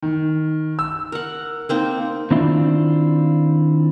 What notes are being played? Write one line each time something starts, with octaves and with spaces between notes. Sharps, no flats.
D#3
E6
A#4 F#5
A#3 C4 D#4
D#3 C4 D4 E4 F4